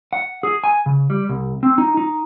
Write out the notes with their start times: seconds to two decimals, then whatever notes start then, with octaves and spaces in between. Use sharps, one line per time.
0.13 F#5
0.43 G#4
0.64 G#5
0.86 C#3
1.10 G3
1.29 C2
1.63 C4
1.78 D#4
1.97 D#4